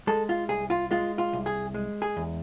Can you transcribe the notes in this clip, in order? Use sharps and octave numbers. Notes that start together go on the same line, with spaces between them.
G#3 A4
F4
C2 G#4
F4
G#3 F4
F4
C2
G#4
G#3
G#4
E2